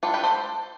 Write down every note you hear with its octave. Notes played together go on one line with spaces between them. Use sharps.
G3 D4 F4 A4
G4 B4
A4 C5